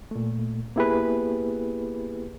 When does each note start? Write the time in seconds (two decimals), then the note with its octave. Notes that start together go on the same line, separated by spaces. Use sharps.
0.11 A#2 A3
0.76 A#3 B3 E4 G4 G#4 B4